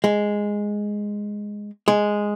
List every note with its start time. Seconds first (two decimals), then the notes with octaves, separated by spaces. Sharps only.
0.04 G#3
1.88 G#3